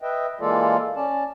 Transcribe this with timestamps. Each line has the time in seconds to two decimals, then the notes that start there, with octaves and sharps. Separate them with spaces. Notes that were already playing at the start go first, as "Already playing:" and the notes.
0.02 B4 D#5 E5 G5
0.41 E3 G#3 A#3 F4 A4 D5
0.96 C#4 D5 A5